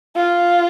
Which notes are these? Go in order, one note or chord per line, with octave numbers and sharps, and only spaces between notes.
F4